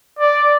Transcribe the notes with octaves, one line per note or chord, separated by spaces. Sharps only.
D5